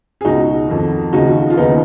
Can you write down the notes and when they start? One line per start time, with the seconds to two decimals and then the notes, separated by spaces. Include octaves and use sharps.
0.21 G#4
0.25 C#2 B2 D#4 F#4
0.68 F2 D#3
1.13 D#2 C#3 F3 D#4 F#4
1.50 F4
1.57 D#2 C#3 F3 B3 D#4